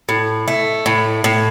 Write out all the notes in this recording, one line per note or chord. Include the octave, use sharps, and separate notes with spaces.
A2
A3
A2
A2